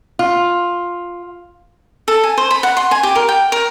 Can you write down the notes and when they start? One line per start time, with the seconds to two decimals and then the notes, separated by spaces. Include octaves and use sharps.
0.19 F4
2.08 A4
2.24 G#5
2.38 C5
2.51 B5
2.63 F#5
2.77 C6
2.91 G#5
3.03 G4
3.15 A#4
3.29 G5
3.52 A#4